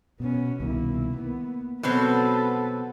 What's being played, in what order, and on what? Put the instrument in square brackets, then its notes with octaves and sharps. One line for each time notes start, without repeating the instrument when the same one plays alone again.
[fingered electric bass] B2 [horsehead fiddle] B3 C#4
[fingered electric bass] C2 B2 D#3 [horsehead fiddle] A#3 E4
[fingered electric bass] A#3 [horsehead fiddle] B3
[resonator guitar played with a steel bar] B2 F#3 C4 [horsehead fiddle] A4 B4